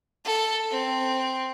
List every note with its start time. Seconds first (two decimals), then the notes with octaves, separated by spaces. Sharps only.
0.25 A4
0.71 C4